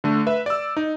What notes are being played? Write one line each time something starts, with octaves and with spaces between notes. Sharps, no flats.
D3 A3
B4 E5
D5 E6
D#4